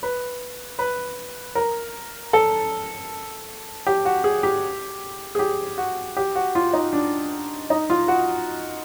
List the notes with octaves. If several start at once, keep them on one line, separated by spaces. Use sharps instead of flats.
B4
B4
A#4
A4
G4
F#4
G#4
G4
G#4
G4
F#4
G4
F#4
F4
D#4
D4
D#4
F4
F#4